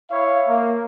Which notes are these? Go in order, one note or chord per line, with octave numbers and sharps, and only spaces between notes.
E4 C#5 E5 F5
A#3